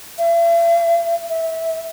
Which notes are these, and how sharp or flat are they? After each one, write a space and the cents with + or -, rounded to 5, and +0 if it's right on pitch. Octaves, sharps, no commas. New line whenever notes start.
E5 +45
E5 -20